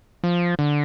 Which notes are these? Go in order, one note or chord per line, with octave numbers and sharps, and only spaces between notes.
F3
D3